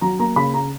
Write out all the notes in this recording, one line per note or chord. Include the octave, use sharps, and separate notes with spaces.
F#3 A#5
A#3 A#5
C#3 B5
A#5